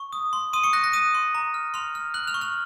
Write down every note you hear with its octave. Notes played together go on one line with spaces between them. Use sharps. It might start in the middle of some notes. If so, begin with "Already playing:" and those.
Already playing: C#6
D#6
C6
C6 D#6 D#7
C#6 C#7
F#6 A#6
A#6
D#6 F#6 D#7
C6
A#5
F6
C6 F6 F7
F6
F#6 F#7
F6 F7
C#6
F6 F7